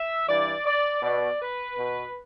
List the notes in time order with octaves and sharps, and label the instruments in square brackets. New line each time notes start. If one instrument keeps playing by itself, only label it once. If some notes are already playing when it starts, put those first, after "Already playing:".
Already playing: [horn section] E5
G2 E3 D5
D5
B2 D5
B4
B2